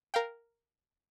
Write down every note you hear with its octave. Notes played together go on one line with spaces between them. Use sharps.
A#4 F5 G5